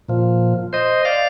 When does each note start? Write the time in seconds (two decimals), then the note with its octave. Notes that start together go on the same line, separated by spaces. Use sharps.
0.09 A#2 F3
0.73 C5 D#5
1.05 D5 F5